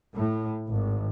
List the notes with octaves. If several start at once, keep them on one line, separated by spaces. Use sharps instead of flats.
A2
G#1